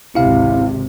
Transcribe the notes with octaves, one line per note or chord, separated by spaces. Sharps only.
G#1 C#2 C3 E4 F5